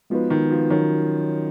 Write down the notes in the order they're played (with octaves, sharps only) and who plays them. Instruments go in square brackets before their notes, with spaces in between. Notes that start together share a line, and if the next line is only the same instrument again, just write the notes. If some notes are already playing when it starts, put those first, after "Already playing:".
[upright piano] F3 [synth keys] G#3 B3 D#4 F#4 B4
[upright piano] D#3
F3
[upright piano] D#3 [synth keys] F#3 C#4 F#4 A#4 C#5